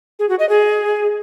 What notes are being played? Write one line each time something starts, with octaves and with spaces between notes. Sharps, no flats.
G#4
F#4
D#5
G#4